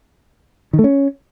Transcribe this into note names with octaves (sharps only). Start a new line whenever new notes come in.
D#3
A3
C#4